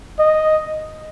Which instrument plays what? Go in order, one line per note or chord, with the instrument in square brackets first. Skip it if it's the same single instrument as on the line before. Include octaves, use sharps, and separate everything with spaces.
[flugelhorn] D#5